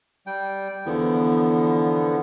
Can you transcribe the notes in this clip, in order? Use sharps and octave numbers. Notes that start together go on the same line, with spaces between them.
G3 G5
E2 D3 F3 B3